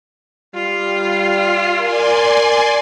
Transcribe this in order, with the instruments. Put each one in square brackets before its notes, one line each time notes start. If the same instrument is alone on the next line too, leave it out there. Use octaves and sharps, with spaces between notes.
[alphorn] G3 [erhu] F4
[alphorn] A#4 [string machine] D5 G#5 C6